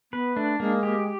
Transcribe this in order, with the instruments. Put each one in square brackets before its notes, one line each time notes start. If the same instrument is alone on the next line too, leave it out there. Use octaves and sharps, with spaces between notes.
[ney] B3 [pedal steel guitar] B4
[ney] A3 [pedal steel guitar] D4
[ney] G#3 [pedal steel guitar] A#3
[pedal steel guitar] G4